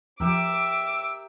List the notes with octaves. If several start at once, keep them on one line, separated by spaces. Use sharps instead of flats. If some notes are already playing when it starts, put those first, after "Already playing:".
F2 F3 G4 A#4 E5 D6 E6 D7